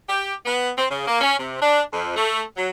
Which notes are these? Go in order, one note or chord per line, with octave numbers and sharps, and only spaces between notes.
G4
B3
C4
C#3
A#3
C#4
C3
D4
F2
A3
F#3